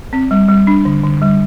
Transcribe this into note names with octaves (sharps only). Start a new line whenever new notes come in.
C4
G3
G3
D4
D3
D3
G3